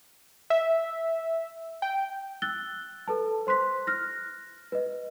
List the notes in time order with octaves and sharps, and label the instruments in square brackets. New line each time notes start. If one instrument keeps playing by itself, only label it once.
[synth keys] E5
G5
[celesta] E6 F#6 A6 G7
A4 B4 A5
C5 C6 F#6 B6
F6 F#6 A#6
B4 D#5